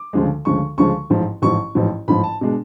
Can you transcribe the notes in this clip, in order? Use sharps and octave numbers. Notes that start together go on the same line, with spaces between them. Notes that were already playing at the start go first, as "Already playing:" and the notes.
Already playing: D6
D2 C#3 F3 G#3
D2 C#3 F3 G#3 C#6
D2 C#3 F3 G#3 C#6
A1 G#2 F3
A1 G#2 F3 C#6
A1 G#2 F3
A1 G#2 F3 B5
A5
B2 G#3 D4